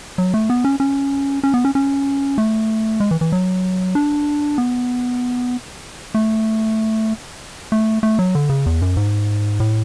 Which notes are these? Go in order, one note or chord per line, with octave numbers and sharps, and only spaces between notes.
F#3
A3
B3
C#4
C#4
C#4
B3
C#4
C#4
A3
G#3
E3
E3
F#3
D4
B3
A3
A3
A3
F#3
D3
C#3
E2
F#2
G#2
A2